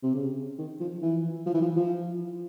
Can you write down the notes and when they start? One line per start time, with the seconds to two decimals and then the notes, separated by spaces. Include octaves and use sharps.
0.03 C3
0.15 C#3
0.59 D#3
0.80 F3
1.02 E3
1.46 F3
1.54 E3
1.62 F3
1.77 F3